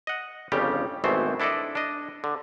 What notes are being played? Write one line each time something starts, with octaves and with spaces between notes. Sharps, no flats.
D#5 F#5
G1 F2 C#3 F3 G3 G4
G#1 B2 E3 A3 C4 C5
D4 E4 A4 D5 D#5
D4 D#5
D3